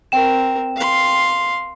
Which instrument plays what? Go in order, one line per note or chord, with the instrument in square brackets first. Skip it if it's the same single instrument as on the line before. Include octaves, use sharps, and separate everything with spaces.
[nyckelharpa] C4 A#4 [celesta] G5 E7
[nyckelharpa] F5 C6